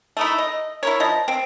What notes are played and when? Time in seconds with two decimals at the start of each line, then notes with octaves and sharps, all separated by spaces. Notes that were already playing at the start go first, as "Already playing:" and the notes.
0.17 A3 D#4 E4
0.38 D#5
0.83 E4 A#4 C#5
1.00 F3 D#5
1.28 C4